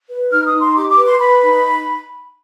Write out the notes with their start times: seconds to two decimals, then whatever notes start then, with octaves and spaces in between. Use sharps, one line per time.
0.10 B4
0.31 D#4 F6
0.46 D#6
0.53 D#4
0.61 C6
0.75 G4 D6
0.90 D6
0.97 B4
1.05 C6
1.19 B4 B5
1.42 D#4